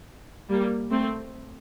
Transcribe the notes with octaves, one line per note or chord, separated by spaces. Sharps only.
G3 A#3
A3 C4